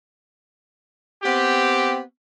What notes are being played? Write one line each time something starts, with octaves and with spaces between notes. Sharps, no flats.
B3 C4 G4